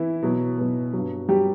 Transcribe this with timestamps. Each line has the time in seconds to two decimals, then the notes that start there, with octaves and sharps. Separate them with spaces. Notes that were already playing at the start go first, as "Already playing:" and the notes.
Already playing: E3 E4
0.22 B2 F#3
0.58 B2 F#3
0.93 G2 F#3
1.29 F#3 G3 G4